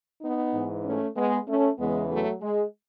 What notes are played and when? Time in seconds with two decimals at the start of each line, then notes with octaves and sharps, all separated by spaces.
0.21 B3 D#4
0.53 G#2 E3
0.84 A3 C#4
1.15 G#3 B3
1.47 A3 C#4
1.78 E2 C#3 E3 G#3 B3
2.09 F#3 A3
2.41 G#3